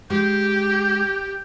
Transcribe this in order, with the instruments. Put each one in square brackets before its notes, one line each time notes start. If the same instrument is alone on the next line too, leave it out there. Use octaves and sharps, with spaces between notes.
[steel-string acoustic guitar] G#3 [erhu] G4 [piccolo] G6